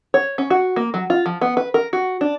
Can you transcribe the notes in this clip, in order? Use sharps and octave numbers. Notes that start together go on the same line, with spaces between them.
C#5
C#4
F#4
A#3
F#3
F4
F3
B3
B4
A#4
F#4
D4